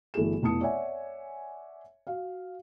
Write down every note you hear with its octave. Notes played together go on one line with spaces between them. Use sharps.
G1 E3 A3 F#4 G#4 E7
F1 B3 E4 A5 D#6 C#7
C#5 D5 E5 F#5 G#5
F#4 F5